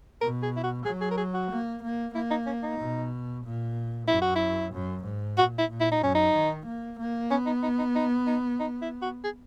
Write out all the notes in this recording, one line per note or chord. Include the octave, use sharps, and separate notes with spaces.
B2 A#4
G#4
E4
F#4
F#3 G#4
G#4
A#4
G#4
F#4
A#3
A#3
A#3 E4
D#4
C#4
D#4
B2
A#2
F#2 E4
F#4
E4
F#2
G#2
A#2 F#4
E4
A#2
E4
D#4
F#2 C#4
D#4
D#3
A#3
A#3
B3 C#4
D#4
D#4
D#4
D#4
D#4
D#4
E4
F#4
G#4